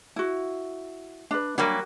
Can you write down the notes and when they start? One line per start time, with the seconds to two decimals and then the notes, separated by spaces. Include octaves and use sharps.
0.16 E4 F#4
1.31 D4 B4
1.58 F#3 G3 A#3 D4